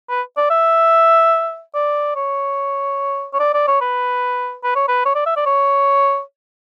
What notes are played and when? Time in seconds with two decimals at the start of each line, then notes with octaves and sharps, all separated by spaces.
0.09 B4
0.37 D5
0.50 E5
1.74 D5
2.16 C#5
3.33 C#5
3.39 D5
3.54 D5
3.67 C#5
3.81 B4
4.63 B4
4.76 C#5
4.88 B4
5.05 C#5
5.15 D5
5.26 E5
5.36 D5
5.46 C#5